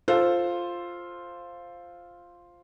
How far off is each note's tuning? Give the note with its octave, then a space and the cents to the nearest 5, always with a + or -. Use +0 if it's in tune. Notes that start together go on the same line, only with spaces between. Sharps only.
F4 +0 A4 +0 C5 +5